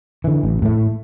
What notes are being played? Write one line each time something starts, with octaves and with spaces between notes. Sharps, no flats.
D3 E3
A1
A2 A3